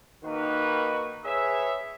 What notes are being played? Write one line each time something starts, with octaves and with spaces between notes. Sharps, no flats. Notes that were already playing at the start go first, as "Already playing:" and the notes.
D#3 A#3 D#4 F#4 B4
G#4 B4 C#5 E5